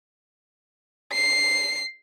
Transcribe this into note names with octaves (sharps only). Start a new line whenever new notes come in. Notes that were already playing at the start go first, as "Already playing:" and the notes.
C7